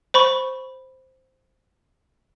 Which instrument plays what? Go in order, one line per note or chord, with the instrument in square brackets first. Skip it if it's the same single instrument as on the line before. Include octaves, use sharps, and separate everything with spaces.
[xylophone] C5 B5 C#6